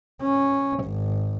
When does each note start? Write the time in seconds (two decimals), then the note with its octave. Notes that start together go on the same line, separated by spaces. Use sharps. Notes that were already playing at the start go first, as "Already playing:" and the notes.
0.23 C#4
0.85 G#1